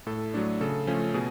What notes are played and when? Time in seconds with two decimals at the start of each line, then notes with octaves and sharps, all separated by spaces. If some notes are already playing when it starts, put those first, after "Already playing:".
0.06 A2 A4
0.34 F#3 A3 D4
0.61 C#3 A4
0.87 F3 A3 C#4
1.14 B2 G#4